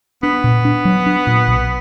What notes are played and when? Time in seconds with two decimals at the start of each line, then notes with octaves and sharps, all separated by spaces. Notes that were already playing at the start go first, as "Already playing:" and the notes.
0.23 B3 D4
0.44 A#2
0.65 D4
0.85 F#3
1.06 D4
1.27 A#2
1.48 B1